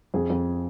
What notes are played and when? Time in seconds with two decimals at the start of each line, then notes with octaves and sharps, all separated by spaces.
0.14 F2 G#4
0.30 F2